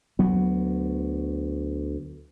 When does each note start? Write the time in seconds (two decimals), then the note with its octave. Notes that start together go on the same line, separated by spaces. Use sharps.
0.19 D2 F#3 B3